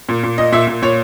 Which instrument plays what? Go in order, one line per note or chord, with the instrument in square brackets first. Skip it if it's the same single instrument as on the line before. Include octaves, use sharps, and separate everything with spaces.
[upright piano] A#2
A#2
A#2 D#5
A#2 E5
A#2
A#2 C#5